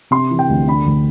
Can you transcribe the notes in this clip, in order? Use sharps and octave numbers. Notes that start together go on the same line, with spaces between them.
C3 C6
E3
G5
D2
D3 B5
D2